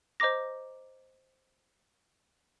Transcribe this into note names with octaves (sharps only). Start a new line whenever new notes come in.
C5 D#5 A#5 D6 A#6